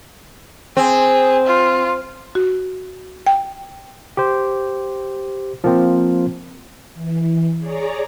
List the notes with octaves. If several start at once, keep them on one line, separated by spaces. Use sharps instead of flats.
C4 G#4
F4
F#4
G5
G4 C5
F3 A#3 C4
E3
G#4 C#5 D5 A#5